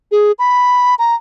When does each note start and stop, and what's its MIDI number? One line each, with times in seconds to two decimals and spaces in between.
0.12 0.32 68
0.39 0.95 83
0.99 1.15 82